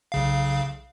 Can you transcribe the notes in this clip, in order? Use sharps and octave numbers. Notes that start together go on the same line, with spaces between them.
B1 C#3 F5